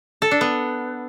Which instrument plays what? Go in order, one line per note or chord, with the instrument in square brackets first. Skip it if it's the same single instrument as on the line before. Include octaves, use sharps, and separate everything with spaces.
[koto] A4
D4
B3